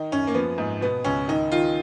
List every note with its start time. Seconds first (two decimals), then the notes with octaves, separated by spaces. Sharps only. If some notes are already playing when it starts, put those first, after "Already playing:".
Already playing: D#3 D#4
0.12 F#2 C#4
0.27 A#3
0.34 F3 B3
0.58 G#2
0.81 B2 B3
1.04 C#2 C#4
1.28 D#3 D#4
1.52 D#3 F4